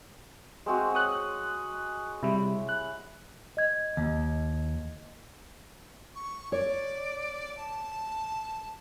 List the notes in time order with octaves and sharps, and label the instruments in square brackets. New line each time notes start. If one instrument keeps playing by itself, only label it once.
[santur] G#3 C4 F#4
[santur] C#5 [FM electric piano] D#6 F#6
[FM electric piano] C3 G3 [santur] E4
[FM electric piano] F#6
[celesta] D#5 G#6
[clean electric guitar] D#2
[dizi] C#6
[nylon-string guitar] C#5 [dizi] D5
[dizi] A5